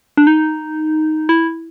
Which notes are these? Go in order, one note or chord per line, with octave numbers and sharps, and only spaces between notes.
D4
D#4
E4